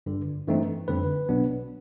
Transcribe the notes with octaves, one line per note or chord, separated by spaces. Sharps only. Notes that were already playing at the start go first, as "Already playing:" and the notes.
G1 G2 D3
G2 E3 A3 C4 D#4
F2 D3 G3 C4 B4
B1 B2 F#3 B3 D4